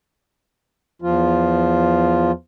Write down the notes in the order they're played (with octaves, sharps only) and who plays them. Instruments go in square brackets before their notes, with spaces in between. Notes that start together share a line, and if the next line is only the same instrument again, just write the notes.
[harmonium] E2 F3 F4